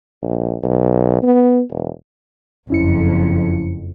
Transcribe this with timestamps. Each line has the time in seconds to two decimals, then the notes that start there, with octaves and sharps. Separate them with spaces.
0.23 A#1
0.63 B1
1.23 B3
1.71 E1
2.70 F#1 F2 C#4 E4 C#7